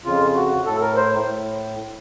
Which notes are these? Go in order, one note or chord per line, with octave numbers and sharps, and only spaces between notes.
F2 C#3 F4
F#4
A2 A4
A#4
C5
A2